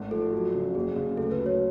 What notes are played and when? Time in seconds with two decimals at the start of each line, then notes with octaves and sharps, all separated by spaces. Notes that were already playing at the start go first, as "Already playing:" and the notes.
Already playing: G#1 A3
0.11 F3 A4
0.33 F#3
0.54 C#3
0.75 F#1 G#4
0.96 C#3
1.18 D2 A4
1.31 B4
1.39 F#3
1.46 C#5